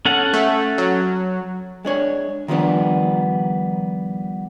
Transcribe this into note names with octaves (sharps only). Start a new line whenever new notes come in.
C#4 A4 F#5
A3
F#3
G#3 D4 C#5
D#3 F3 G3 B3 D4